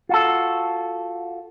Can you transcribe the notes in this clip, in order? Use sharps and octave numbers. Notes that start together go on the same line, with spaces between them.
F4 F#4 A4